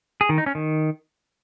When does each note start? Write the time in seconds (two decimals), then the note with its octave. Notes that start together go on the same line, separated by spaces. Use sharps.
0.21 G#4
0.29 D#3
0.38 D#4
0.46 C#4
0.55 D#3